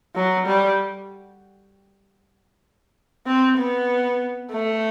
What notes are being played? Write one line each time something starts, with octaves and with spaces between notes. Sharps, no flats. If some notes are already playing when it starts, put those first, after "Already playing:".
F#3
G3
C4
B3
A3